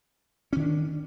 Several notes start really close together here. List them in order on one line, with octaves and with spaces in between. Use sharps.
C#4 D#3 D4